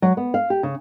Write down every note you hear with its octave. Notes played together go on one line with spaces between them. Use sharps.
F#3
B3
F5
G4
C#3